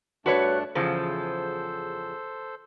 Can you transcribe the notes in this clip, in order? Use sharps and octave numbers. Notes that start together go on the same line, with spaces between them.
G2 A3 D4 F#4 B4 C#5
E2 C#3 F3 A4 C5